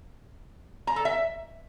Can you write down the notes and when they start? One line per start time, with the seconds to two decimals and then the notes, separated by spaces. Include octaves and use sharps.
0.87 A#5
0.96 A4
1.05 E5